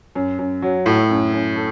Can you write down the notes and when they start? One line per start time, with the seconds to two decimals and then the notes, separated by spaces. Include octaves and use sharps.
0.15 F#2
0.39 F#2
0.62 F#3
0.86 A2 A3
1.10 F#2
1.33 F#2
1.56 A3